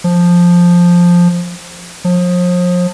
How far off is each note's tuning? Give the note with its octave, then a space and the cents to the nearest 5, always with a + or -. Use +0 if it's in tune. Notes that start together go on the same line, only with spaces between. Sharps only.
F3 +5
F3 +35